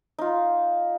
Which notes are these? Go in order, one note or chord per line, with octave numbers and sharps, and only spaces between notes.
D#4 F4